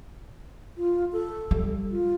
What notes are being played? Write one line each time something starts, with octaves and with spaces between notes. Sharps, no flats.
F4
A4
G3
F4